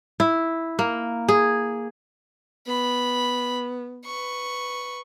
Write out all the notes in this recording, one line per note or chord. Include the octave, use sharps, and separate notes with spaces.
E4
A#3
G#4
B3 B5
B4 C#6